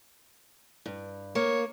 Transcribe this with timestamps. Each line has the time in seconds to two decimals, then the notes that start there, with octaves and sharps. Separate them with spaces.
0.86 G2
1.35 A#3 C#5